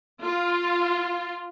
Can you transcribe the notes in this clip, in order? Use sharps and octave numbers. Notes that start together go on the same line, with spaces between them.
F4